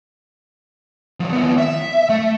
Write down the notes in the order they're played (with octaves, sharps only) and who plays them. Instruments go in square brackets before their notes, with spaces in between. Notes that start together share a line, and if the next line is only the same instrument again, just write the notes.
[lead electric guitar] F3 G3
D#2 B3
E5
A3